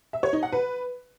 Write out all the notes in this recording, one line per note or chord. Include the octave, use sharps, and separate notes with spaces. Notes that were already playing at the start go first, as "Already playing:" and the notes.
E5
C#5
D#4
F#5
B4